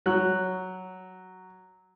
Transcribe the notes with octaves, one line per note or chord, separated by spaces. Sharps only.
F#3 F#6